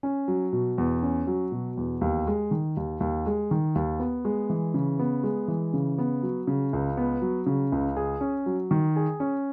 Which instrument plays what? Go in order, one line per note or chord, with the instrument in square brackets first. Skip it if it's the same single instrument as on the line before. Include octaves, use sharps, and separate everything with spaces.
[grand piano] C#4
F#3
B2
E2
C#4
F#3
B2
E2
D#2
G#3
D#3
D#2
D#2
G#3
D#3
D#2
B3
G#3
E3
C#3
B3
G#3
E3
C#3
B3
F#3
C#3
C#2
B3
F#3
C#3
C#2
G#4
C#4
F#3
D#3
G#4
C#4